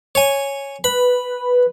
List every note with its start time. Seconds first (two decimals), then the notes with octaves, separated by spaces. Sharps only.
0.15 C#5 G#5
0.84 B4 B5